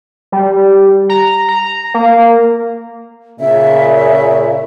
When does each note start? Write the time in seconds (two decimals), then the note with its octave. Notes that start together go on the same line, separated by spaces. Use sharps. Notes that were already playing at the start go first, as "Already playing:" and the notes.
0.32 G3
1.09 A#5
1.49 A#5
1.94 A#3
3.40 A#2 C#3 E5